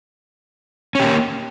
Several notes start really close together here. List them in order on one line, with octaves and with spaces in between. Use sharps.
C#4 G4 A#3